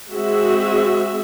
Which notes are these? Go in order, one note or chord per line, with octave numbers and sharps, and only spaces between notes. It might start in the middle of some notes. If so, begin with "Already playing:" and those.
G#3 C4 F#4 G#4 E5